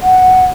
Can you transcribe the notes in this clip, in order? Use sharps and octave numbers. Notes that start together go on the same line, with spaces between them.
F#5